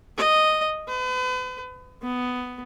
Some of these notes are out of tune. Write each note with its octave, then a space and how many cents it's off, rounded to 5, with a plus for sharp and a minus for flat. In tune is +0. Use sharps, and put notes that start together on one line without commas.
D#5 -5
B4 +40
B3 +10